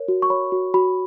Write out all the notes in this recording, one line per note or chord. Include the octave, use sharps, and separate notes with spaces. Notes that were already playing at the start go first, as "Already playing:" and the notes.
Already playing: A#4 C#5
F#4
C#6
C#5 B5
F#4
F#4 B5